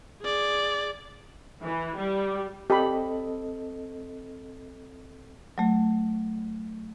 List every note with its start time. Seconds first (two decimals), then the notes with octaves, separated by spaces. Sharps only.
0.22 G#4 D5
1.63 E3
1.96 G3
2.70 C4 G4 A4 D#5 B5
5.58 F#3 A3